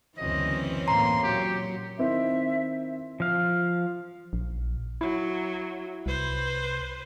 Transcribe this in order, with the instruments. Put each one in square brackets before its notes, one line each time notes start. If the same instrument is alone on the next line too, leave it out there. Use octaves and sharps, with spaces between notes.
[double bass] F#1 D2 [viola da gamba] E3 C4 C#4 [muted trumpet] D#5
[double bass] A2 A#3 [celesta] A#5 [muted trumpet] C6
[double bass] A#2 [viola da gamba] F#3 [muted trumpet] G4
[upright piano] D#3 C4 E4 [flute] E5
[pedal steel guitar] F3 F5
[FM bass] A#1
[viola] F#3 [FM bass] E4
[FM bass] C2 [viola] B4 C5